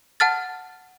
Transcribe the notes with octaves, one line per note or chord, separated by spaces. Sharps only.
F#5 A5 F6 A6